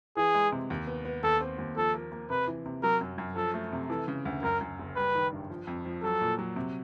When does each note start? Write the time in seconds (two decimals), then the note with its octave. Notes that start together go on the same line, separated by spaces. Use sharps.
0.17 E3 G#4
0.34 G#3
0.52 C3
0.70 D#2
0.87 B3
1.05 B3
1.23 D#2 A4
1.41 C4
1.59 D#2
1.77 F3 A4
1.94 A#3
2.12 A#3
2.30 C3 B4
2.48 E3
2.66 C3
2.83 F#3 A#4
3.01 F#2
3.18 F#2
3.36 F3 A4
3.54 A3
3.73 C3
3.90 E3 A4
4.08 C#3
4.25 D2
4.43 F#2 A#4
4.61 F#2
4.79 F#1
4.96 G3 B4
5.15 D#3
5.33 G2
5.50 F3
5.67 F2
5.85 F3
6.02 F#3 A4
6.21 A#2
6.39 F#3
6.56 C3